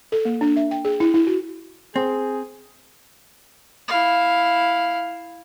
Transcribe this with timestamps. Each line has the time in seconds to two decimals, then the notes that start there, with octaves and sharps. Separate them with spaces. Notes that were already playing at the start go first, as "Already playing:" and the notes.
0.12 A4
0.25 A#3
0.41 D4
0.56 E5
0.71 G5
0.85 G#4
1.00 E4
1.14 E4
1.27 F#4
1.96 C4 G#4
3.88 E4 F5